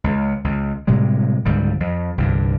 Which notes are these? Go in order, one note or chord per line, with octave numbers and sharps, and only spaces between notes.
C#2
C#2
A2 C3 G3 G#3
C#2 G#2 D3 G3
F2
C2 G2 D3